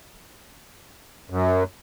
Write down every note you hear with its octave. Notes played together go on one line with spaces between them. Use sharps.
F#2